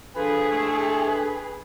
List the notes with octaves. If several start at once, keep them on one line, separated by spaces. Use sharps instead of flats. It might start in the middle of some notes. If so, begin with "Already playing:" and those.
F3 D4 G#4 A4 B4
A2 G#3 A3
B4